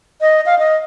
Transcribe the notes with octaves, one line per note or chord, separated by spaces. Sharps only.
D#5
F5
D#5